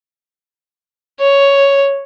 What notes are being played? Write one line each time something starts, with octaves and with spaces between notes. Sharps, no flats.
C#5